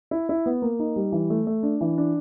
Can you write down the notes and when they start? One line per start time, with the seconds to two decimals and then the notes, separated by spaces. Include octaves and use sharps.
0.11 E4
0.29 E4
0.46 B3
0.62 A#3
0.79 D#4
0.96 G3
1.12 E3
1.30 A3
1.47 A3
1.63 D4
1.81 E3
1.98 D4